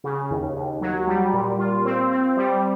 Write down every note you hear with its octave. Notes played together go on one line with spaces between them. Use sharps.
C#3
D#2
D#2
F#3
G3
A#2
F4
C4
C4
G3